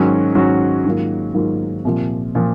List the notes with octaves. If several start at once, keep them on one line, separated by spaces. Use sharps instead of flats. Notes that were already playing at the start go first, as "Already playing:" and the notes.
Already playing: G#2 D#3 F#3 C#4 F#4
G#2 D#3 F#3 C#4 F#4
G#2 D#3 F#3 A#3 F4
G#2 D#3 F#3 A#3 F4
C2 A#2 F3
A#2 F3